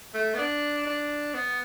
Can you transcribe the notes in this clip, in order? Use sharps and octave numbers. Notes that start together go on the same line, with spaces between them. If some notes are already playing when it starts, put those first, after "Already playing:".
A3
B3
D4
D4
B3